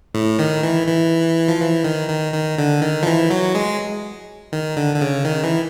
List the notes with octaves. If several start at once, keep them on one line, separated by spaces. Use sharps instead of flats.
A2
D#3
E3
E3
F3
E3
D#3
D#3
D#3
D3
D#3
F3
E3
F#3
G#3
D#3
D3
D3
C#3
D#3
E3